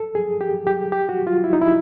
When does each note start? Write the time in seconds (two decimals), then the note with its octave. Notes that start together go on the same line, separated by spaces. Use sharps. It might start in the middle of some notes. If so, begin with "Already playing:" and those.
Already playing: A4
0.15 G#4
0.41 G4
0.67 G4
0.92 G4
1.09 F#4
1.27 F4
1.44 E4
1.53 D#4
1.62 E4